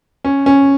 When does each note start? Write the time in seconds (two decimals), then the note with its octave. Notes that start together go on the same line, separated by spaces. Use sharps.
0.24 C#4
0.46 C#4